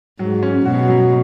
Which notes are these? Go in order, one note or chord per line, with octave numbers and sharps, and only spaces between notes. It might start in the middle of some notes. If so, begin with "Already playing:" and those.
G#2 F#3
C#4
B2 F#4
F#3